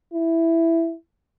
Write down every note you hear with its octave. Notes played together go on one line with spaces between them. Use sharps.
E4